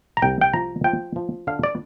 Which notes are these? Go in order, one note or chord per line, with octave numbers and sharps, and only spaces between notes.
A#5
C2 G5
G5
F3 A#5
F3 G5
F3
D3 F5
D5